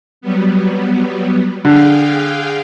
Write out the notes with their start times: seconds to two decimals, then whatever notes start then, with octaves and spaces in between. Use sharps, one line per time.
0.21 F#3 G3 B3
1.65 D3 G#4 F5 G5